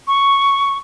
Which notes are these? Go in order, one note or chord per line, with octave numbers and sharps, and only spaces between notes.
C#6